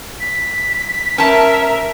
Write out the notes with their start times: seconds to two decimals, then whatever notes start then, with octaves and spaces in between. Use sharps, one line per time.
0.20 B6
1.18 C#4 A#4 E5 A5